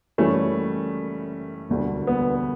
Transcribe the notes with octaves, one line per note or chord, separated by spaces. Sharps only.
F#1 F#2 E3 G3 A3 C#4
E1 D2 D3 G3
B3